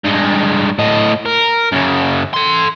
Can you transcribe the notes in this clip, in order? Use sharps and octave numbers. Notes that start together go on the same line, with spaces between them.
G2 G#3
A2 D#5
A#4
F#2 C#3
A4 C6